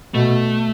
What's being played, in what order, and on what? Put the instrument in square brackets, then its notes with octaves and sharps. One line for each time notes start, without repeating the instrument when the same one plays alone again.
[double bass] B2 [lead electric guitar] A3